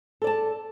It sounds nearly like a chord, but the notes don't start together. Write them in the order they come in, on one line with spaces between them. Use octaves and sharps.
A4 D5 A5